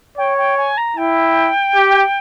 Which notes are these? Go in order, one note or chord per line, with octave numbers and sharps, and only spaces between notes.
C#5 G5
G5
G#5
A#5
E4 G5
G4